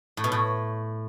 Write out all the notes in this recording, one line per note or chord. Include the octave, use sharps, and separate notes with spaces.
A2
B2
A2